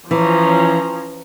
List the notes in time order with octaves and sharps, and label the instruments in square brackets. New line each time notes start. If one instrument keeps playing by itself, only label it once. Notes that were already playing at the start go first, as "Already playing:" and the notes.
[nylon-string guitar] E3 [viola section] F3 C#4 A#5